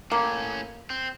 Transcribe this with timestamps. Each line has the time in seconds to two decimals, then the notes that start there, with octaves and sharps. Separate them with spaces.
0.12 A2 A#3 C#4
0.90 C4